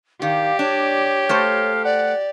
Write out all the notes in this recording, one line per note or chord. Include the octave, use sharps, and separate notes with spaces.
D#3 G4 D5 F5
D4 C#5
A3 A4 C5 F5
D5 F#5